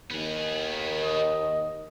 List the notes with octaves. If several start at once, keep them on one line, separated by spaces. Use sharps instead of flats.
D#2 D#3 B3 G#4
D#5